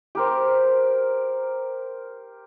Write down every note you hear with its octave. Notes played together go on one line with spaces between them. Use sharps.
G4 A#4 C5